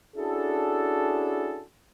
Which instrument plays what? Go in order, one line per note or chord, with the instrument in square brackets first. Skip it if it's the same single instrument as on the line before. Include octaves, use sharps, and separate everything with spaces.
[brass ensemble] C#4 D4 E4 F#4 G#4 A4